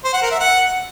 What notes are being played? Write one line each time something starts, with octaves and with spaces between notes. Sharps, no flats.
C5
F#5
A#4
E5
F#5